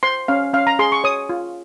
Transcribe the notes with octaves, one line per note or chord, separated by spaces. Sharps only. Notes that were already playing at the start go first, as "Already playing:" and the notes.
C5 C6
C#4 F5
C#4 F5
A#5
G#4 C6
C#6
C#5 D#6
F4